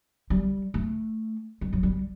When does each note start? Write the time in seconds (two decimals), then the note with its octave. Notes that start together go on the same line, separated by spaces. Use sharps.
0.30 G3
0.74 A3
1.61 G3
1.73 F#3
1.83 G3